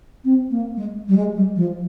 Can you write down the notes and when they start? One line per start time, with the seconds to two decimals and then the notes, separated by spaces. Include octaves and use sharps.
0.25 C4
0.51 A#3
0.77 G#3
1.08 G3
1.16 G#3
1.36 G3
1.56 F3